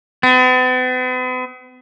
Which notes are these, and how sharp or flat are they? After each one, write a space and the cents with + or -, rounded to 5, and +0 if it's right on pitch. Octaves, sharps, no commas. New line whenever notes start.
B3 +45